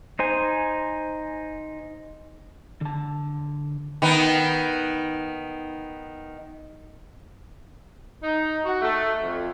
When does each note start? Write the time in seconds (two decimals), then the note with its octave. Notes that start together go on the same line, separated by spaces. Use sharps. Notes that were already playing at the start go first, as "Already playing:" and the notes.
0.19 D#4 C5 G#5
2.81 D3 A5
4.02 D#3 B3
8.23 D#4
8.65 F#4
8.81 A3
9.22 F2